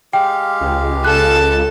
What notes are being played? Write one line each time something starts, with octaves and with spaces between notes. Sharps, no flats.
G#3 G4 F5 G5
C#2
A4 A5 F#6